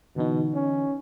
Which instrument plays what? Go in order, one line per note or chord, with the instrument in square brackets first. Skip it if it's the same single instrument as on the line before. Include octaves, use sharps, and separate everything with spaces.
[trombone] B2 [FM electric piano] D3 E3 D#4
[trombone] C#4